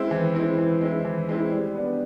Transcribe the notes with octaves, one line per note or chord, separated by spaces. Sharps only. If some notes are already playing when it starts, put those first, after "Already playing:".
Already playing: G#3 C4 E4
E3
G#3 C4 E4
E3
G#3 C4 E4
E3
G#3 C4 E4
G3
B3 D4